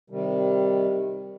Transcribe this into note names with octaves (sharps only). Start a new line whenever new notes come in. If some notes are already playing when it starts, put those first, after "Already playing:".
C3 D#3 G3